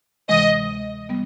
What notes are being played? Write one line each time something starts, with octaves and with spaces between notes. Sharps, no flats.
D2 C3 E3 G#3 D#5
G3 B3